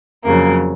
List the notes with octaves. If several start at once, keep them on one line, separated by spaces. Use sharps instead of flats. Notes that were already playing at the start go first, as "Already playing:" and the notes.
F2 C#3 F#3 A#3